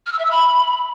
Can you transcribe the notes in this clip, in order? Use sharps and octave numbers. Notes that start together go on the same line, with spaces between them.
F6
E6
E5
E6
B5